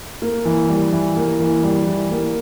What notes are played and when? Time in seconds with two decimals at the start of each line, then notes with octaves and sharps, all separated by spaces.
0.22 A#3
0.45 E3
0.69 G3
0.93 E3
1.16 A#3
1.39 E3
1.64 G3
1.87 E3
2.11 A#3